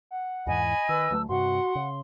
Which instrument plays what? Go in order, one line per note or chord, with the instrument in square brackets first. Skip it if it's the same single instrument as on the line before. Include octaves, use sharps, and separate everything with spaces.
[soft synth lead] F#5
[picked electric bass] E2 G#2 E3 [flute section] D#5 G#5 B5
[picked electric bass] D#3 [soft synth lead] B4 [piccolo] E6
[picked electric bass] D2 F#3 A3
[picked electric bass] G2 C3 [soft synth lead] F#4 [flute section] F#5 [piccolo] C6
[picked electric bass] C#3